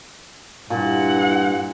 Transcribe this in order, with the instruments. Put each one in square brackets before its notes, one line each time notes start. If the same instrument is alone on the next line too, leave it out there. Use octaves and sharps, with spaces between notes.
[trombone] G2 [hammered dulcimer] A#2 [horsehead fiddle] E4 F#5